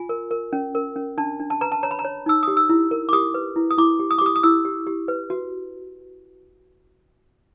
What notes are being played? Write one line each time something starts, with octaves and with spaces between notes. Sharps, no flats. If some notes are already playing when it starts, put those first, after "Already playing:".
Already playing: F4 G#5
A#4
A#4
C#4
A#4
C#4
D4 A5
D4
A5
B4 A#5
A5
C#5 A#5
B5
A#5
C#5
D#4 E6
G4 D#6
E6
E4
A#4
D6
G4 D#6
B4
E4
D#6
E4 D6
G4
D#6
D6
G4 D#6
D#6
E4 E6
G4
G4
B4
F#4